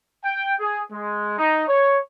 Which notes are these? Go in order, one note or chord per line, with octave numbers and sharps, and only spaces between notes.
G5
G#4
G#3
D#4
C#5